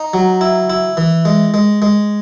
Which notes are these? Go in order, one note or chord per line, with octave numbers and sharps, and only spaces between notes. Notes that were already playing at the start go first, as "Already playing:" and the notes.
Already playing: D#4
F#3
E4
E4
E3
G#3
G#3
G#3